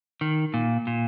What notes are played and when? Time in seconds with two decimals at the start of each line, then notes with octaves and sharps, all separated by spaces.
0.21 D#3
0.54 A#2
0.87 A#2